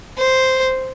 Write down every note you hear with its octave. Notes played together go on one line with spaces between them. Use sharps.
C5